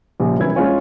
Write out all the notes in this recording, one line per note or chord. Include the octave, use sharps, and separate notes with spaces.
A#1 C#3 F3 G3
E1 C2 E3 C#4 E4 G#6
G#3 C#4 F4 C#5 G#5